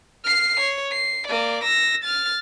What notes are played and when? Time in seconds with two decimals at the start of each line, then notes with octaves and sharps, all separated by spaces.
0.24 F6 C7
0.60 C#5
0.92 C7
1.27 A#3 D5
1.64 E6 A#6
2.04 F6 A6